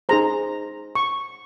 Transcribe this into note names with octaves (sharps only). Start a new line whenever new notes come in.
D#4 G#4 C5 A#5
C#6